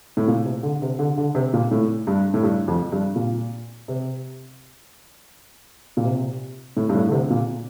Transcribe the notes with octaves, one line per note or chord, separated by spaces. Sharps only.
A2
A#2
C3
D3
C3
D3
D3
C3
A#2
A2
G2
A2
G2
F2
G2
A#2
C3
A#2
C3
A2
G2
A2
D3
C3
A#2